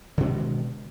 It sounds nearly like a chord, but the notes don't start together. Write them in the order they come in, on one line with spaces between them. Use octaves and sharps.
D3 B2 G#3 D#3